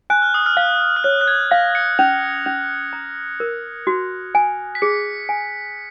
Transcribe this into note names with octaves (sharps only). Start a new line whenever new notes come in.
G#5 F#6
F6
D#6
F6
F5
F6
C#5 F#6
F#6
G#6
F5 A#6
C#7
C#4 F7
C#4 F7
A#5
A#4
F#4
G#5
B6
G#4 C#7
G#5